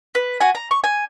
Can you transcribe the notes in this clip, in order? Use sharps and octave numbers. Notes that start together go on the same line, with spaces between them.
B4
F#4 G#5
A#5
C#6
G#5